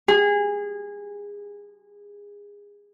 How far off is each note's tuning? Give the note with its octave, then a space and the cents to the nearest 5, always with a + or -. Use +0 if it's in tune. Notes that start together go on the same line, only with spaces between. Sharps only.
G#4 -25